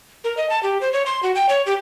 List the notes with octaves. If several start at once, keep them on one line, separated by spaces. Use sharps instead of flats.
A#4
D#5
A5
G4
C5
C#5
C6
F#4
G5
C#5
G4